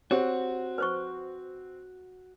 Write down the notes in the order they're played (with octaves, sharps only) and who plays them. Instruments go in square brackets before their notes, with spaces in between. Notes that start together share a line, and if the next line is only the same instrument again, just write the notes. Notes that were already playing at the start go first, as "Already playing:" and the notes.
[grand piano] C4 [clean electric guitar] F#4 F#5 [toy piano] G4 C#5
[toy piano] B4 C5 C#6